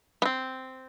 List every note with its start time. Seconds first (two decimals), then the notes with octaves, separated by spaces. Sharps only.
0.22 B3
0.25 C4